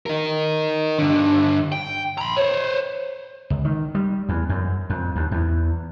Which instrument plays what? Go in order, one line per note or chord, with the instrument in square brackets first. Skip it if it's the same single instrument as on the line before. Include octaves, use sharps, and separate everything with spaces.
[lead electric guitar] D#4 A#4
G2 D3
G5
A#5 B5
C5 C#5
[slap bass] C#2
D#3
G3
E2
F#2
F2
D#2
E2